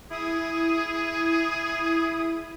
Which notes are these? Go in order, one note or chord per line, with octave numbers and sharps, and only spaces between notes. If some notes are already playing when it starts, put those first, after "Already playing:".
E4 G#4 D#6